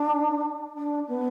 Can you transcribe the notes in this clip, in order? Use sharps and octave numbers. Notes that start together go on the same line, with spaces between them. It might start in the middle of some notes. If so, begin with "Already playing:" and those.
Already playing: D4
D4
B3